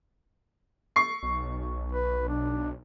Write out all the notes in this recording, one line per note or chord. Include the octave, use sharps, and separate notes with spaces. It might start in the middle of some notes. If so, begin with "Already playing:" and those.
C#6 C7
B1
B4
D4